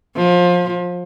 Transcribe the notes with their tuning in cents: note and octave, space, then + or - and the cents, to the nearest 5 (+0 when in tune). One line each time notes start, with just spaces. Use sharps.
F3 +25